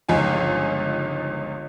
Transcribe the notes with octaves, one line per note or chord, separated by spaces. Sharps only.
G1 C#2 F3 D#4 G#5